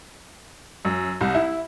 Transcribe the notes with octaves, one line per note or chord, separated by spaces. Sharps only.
F#2
C2
E4